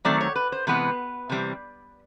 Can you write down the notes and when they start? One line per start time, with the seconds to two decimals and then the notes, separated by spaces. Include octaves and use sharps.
0.05 D#3 F#3 A3 C4 D5
0.21 C#5
0.36 B4
0.52 C5
0.67 C3 E3 G#3 B3 B4
1.30 C3 E3 G3 C4